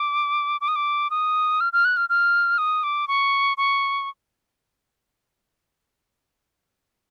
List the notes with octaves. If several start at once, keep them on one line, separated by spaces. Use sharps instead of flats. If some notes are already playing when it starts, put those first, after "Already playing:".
Already playing: D6
D6
D#6
D6
D#6
F6
F6
F#6
F6
F6
D#6
D6
C#6
C#6